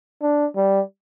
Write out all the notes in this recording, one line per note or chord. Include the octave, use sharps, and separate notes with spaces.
D4
G3